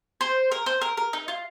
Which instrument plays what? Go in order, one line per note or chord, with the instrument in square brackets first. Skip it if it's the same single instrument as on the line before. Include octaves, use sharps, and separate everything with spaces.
[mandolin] C5
A#4
C5
A#4
A#4
D#4
F4